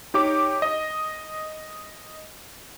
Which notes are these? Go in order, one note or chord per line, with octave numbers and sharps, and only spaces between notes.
D#4 G4 C#5 D6
D#5